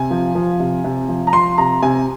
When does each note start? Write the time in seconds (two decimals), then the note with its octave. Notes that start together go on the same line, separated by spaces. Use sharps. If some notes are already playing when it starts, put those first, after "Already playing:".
Already playing: C3 G#5
0.10 F3
0.35 F3
0.60 C3
0.84 C3
1.08 F3
1.27 A#5
1.33 F3 C6
1.58 C3 A#5
1.82 C3 G#5